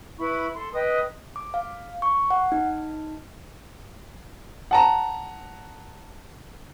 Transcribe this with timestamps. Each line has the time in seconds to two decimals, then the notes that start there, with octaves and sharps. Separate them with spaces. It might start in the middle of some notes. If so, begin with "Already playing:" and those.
0.19 E4 B4 B5 C#6
0.54 A4 C6
0.73 B4 D#5 G5 D#6
1.36 D6
1.54 F5
2.02 C#6
2.31 F#5
2.52 D#4
4.71 F#5 A5 A#5